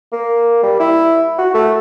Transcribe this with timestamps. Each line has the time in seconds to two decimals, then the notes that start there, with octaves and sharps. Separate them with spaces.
0.13 A#3
0.63 G3
0.80 E4
1.38 F#4
1.54 A3